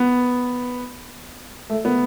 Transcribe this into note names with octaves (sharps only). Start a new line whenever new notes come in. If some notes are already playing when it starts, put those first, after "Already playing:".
Already playing: B3
A3
B3